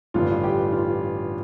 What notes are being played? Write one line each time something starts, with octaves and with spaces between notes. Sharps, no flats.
A1 G2 D3 F4
G4
F4